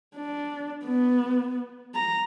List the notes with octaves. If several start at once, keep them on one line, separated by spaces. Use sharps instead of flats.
D4
B3
A#5